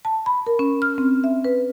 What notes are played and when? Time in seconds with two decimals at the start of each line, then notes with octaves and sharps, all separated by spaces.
0.05 A5
0.26 B5
0.47 A#4
0.59 C#4
0.82 F6
0.98 C4
1.24 E5
1.44 B4